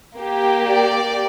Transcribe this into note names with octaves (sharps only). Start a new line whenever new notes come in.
A#3 G4
D5